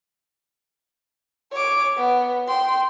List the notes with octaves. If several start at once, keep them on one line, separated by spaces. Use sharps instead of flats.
C#5 D6
B3
G5 C6